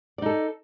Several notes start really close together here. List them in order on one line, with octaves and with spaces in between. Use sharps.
D5 D#4 A4